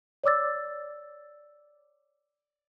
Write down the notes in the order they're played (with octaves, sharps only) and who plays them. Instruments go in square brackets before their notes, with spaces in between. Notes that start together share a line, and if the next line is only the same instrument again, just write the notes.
[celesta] C#5 D5 D6 E6 A6